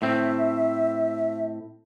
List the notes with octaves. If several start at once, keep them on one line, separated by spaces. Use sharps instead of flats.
A2 C4 E5